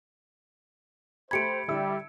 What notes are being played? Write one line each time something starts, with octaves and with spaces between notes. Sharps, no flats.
A3 G4 C5 B5 G#6 C#7 D7
D3 G3 E4 E6